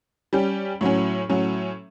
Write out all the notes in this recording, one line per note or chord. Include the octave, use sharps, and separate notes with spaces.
G3 C#4 G4
A2 F#3 C#4
A2 F#3 C#4